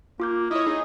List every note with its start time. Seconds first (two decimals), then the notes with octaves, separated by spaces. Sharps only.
0.20 A#3 F4 D6 G6
0.51 E4 C#5 D#5
0.67 D#4 G#4